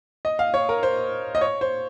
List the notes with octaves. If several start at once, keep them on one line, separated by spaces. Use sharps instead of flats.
D#5
F5
C#5
A#4
C5
D#5
C#5
C5